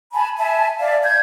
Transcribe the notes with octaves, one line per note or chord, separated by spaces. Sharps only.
G#5 A5 B5
E5 G#5 A5
D5 E5 F5
G6 G#6